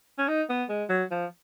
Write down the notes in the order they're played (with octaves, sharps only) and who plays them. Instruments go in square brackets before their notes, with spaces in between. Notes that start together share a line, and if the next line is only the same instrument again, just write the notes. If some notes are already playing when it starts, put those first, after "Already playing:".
[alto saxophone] C#4
D#4
B3
G#3
F#3
F3